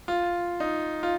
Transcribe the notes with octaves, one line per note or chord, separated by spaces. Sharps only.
F4
D#4
F4